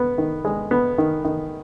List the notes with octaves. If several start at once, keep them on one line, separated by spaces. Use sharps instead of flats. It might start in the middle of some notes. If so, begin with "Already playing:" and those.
Already playing: B3
D#3
G#3
B3
D#3
D#3